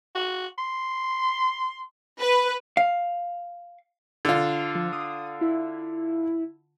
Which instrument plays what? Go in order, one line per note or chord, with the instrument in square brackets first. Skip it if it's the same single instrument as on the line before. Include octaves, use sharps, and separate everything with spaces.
[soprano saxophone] F#4
C6
[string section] B4
[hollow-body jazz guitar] F5
[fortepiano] D3 F4
[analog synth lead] F3
D#6
E4